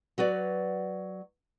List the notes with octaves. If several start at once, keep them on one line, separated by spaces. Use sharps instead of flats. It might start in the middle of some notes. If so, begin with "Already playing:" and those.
F#3 F#4 B4 D5